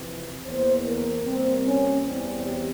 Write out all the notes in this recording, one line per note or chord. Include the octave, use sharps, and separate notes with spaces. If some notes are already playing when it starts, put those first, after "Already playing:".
Already playing: F2 C3 E3
E2 E3 A#3 C5
A#4
C3 G3 A#3 C4
C#4
E2 E3 G3 C4
G4